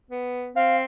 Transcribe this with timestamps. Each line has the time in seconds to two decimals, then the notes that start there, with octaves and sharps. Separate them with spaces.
0.11 B3
0.56 C4 F5